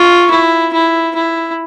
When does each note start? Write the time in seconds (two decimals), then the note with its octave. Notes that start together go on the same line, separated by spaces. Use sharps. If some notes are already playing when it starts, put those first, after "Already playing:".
Already playing: F4 C#6
0.30 E4
0.73 E4
1.15 E4